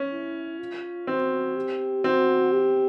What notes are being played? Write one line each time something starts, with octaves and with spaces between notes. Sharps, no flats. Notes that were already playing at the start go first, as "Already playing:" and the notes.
Already playing: C#4
E4
F4
C4 F#4
G4
C4 F#4
G4